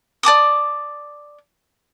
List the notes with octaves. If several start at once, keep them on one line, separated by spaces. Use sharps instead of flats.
D5 A5 D6 D#6